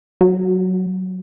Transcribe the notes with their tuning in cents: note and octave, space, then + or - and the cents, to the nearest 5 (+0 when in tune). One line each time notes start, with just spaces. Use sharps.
F#3 +5